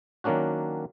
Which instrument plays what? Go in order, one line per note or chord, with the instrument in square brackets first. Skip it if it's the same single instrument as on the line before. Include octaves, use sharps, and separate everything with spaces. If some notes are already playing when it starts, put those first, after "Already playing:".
[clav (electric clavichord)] D#3 F#3 A#3 C#4 D4 F#4